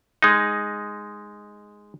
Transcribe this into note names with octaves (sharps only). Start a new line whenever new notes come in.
G#3 D#4